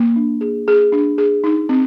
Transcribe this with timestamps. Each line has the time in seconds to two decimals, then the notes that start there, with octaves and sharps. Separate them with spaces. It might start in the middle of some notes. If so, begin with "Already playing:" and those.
Already playing: A#3
0.16 D4
0.41 G#4
0.68 G#4
0.92 D4
1.18 G#4
1.44 D#4
1.69 C4